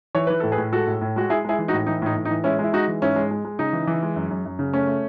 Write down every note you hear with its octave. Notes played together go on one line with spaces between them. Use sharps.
E3 C#5
E3 B4
A2 A4
G#4 B4
A2
G#3 F#4 A4
A2
A2
G#3 F#4
G#3 E4 G#4
G#3 E4 G#4
E3
D#4 F#4
A2
E3 D#4
A2 D#4
A2
D#4
E3
G#3 C#4 E4
G#3 E4
G#3 D#4 F#4
E3
G#2 C#4 E4
G#3
G#3
G#3
C#3 D#4
E3
E3
G#3
F#2
F#2
F#2
C#3
A3 C#4
A3